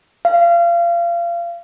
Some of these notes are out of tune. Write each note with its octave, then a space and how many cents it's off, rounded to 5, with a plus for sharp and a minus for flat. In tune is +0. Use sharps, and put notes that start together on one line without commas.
F5 -30